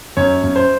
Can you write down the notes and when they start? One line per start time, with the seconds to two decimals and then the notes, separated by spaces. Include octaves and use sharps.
0.17 F#2 C#5
0.43 F#2
0.56 C5